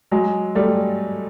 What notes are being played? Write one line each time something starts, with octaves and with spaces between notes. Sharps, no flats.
F#3 G#3
G3 A3